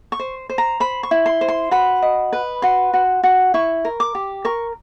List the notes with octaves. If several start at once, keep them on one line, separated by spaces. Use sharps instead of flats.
C#6
C5
C5
A#5
C5 B5
C#6
E4
C6
C5
C6
F#4 B5
D#5
B4
F#4 C6
F#4
F#4
E4 C#6
A#4
D6
G4
A#4 C#6